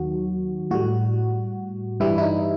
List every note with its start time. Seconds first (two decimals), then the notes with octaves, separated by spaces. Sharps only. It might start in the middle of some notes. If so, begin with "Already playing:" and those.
Already playing: D#2 D#3 F#3 F#4
0.71 A2 G3 F#4
2.00 G2 E3 G3 E4
2.18 E4
2.22 D#4